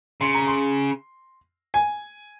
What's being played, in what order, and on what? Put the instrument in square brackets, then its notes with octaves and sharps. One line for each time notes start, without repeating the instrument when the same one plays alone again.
[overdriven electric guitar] C#3 [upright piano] C6
[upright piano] A#5
C6
G#5